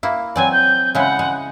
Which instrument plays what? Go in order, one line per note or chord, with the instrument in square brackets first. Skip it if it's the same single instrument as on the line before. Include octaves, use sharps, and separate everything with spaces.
[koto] A#3 E4
[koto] F#3 C4 D5 [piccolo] G#5
[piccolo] G6
[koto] C#3 G#3 E4 [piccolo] F#5
[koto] G#3